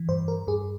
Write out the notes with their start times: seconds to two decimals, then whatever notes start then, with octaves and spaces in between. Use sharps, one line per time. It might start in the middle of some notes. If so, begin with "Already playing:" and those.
Already playing: E3
0.08 G2 C5
0.28 A#4
0.47 G2 G#4